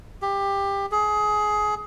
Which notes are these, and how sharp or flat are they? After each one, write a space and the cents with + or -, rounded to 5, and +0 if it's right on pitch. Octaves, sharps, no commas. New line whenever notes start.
G4 +20
G#4 +20